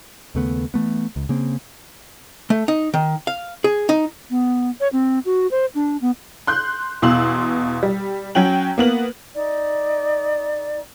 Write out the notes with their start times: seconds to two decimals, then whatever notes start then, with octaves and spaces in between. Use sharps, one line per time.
0.35 D#2 C#3 A3 B3
0.74 E3 A3 B3
1.16 C#2
1.29 C#3 A#3 C4
2.50 A3
2.68 D#4
2.94 D#3
3.27 F5
3.64 G#4
3.89 D#4
4.31 B3
4.80 C#5
4.93 C4
5.25 F#4
5.51 C5
5.75 D4
6.01 B3
6.47 C6 F#6 G6
7.02 E2 B2 F5 C6 E6 F#7
7.83 G3
8.35 F#3 C#4 F#4 G5 F#7
8.78 A#3 B3 F#7
9.33 D#4 D5